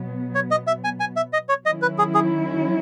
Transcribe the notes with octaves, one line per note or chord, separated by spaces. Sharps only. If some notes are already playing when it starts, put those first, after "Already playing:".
Already playing: B2 F#3 B3
C#5
D#5
E5
G#5
G#5
E5
D#5
C#5
D#3 F#3 C#4 E4 D#5
B4
G#4
G#4